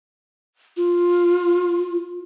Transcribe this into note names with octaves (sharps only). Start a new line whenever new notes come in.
F4